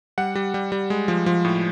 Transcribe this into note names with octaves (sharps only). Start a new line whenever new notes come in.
G3 F#5
G3
G3
G3
G#3
F3
F3
A2